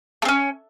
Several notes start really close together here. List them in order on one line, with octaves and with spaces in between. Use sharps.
A3 C4 C#4